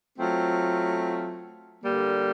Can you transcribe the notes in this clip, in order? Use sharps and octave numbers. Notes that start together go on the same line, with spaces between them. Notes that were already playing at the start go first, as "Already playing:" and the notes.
F#3 A3 C4 F4
D3 G3 A#3